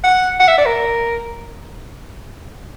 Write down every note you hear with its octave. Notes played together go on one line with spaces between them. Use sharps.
F#5
F#5
E5
D5
A#4